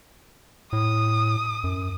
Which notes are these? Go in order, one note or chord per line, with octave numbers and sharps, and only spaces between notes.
A2 D#6
F#2